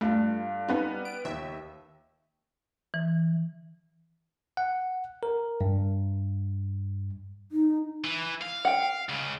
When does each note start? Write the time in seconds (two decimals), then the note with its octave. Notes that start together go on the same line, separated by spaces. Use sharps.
0.01 G2 A3 F4
0.68 G3 B3 D#4
1.05 D7
1.25 D#2 E5
2.94 E3
4.57 F#5
5.23 A#4
5.61 G2
7.52 D#4
8.05 E3
8.42 F5
8.65 F#5 G5
9.09 C#2 C#3